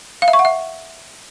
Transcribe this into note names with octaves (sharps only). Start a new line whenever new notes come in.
F5
E5
C#6
F#5
E5